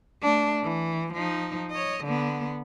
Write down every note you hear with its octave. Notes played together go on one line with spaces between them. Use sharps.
A3 D4
E3
F3 D#4
C#5 D#5
D3 B3